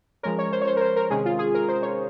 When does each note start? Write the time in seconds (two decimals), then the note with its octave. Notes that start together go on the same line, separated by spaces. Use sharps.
0.23 F3 G#3 C#4 A#4
0.39 C#5
0.52 C5
0.62 C#5
0.67 C5
0.77 A#4
0.81 C5
0.96 A#4
1.10 C3 D#3 G#3 C#4 G#4
1.26 F4
1.39 G#4
1.54 A#4
1.68 C5
1.83 C#5